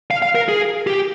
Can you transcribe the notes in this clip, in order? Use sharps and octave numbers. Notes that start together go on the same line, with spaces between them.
F5
F5
A#4
G#4
G4